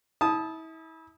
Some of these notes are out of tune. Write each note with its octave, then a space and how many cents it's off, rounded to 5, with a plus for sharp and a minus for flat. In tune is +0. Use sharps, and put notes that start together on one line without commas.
E4 -35 A5 -20 D#6 +0